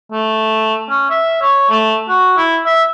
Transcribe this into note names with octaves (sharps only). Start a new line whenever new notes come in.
A3
C#4
E5
C#5
A3
F#4
E4
E5